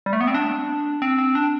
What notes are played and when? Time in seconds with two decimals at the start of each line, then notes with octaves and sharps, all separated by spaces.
0.06 G3
0.13 A3
0.21 B3
0.27 C4
0.34 D4
1.02 C4
1.18 C4
1.35 D4